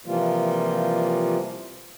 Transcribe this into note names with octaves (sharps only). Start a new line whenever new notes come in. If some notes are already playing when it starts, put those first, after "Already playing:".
C3 E3 F3 G3 A#3 F4